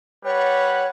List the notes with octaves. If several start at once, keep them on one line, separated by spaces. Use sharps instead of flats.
G3 B4 C#5 F#5